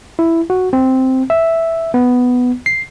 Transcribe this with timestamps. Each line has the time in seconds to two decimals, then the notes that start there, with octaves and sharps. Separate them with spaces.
0.19 E4
0.50 F#4
0.73 C4
1.30 E5
1.94 B3
2.66 C7